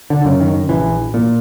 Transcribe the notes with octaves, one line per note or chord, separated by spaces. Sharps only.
D3
F#2 C#3
D#3
A#1 E3
A#2